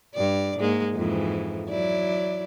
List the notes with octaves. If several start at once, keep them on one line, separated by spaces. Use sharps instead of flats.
G2 D5
G#2 G#3 A#3
F2 G#2 E3
F#3 E4 D5